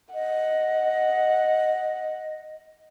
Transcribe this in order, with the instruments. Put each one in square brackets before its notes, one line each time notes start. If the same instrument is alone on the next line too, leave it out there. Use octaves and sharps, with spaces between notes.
[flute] D#5 [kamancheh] F#5